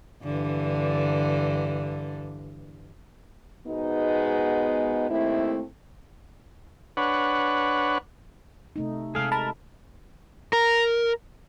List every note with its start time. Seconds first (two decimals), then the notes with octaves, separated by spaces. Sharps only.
0.24 G2 D3 E3
3.66 G#2 B2 G#3 B3 D#4
5.09 D#2 A3 C4 E4
6.97 D4 B4 C#5 F#5
8.76 C3 A3 D#4
9.15 C3 G#3 G#4 A4 F5
9.32 A#4 A5 B5
10.53 A#4